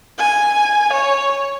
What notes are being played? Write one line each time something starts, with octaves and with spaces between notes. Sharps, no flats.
G#5
C#5